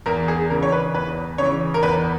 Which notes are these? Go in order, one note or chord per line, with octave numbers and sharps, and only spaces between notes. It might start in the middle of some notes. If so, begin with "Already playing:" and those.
E2 A#4
G#4
C#3 E3 A#4
C#5
B4
E2 B4
C#3 E3 C#5
A#4
E2 B4